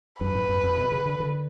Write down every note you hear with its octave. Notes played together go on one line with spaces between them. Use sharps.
F#2 B4
G#2
F#2
F2
B2
C#3
D3
D3